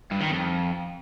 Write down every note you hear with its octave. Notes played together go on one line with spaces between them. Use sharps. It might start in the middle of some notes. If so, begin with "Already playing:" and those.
G2
D#3
F2